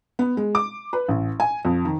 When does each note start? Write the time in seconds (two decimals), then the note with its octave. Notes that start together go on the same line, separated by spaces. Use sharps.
0.19 B3
0.37 G#3
0.55 D6
0.93 B4
1.08 A1
1.40 G#5
1.65 F2
1.85 D#3